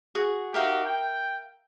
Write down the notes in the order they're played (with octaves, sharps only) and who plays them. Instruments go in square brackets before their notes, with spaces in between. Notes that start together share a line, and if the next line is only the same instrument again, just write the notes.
[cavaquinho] F#4 G#4
[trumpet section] D#4 F#4 G4 [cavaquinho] A#4 E5 F5
[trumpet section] G5